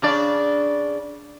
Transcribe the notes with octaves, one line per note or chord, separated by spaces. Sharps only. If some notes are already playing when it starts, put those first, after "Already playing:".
C#3 D4 D5